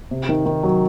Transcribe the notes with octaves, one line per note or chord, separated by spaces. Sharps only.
C3
D#3
D#3
F#3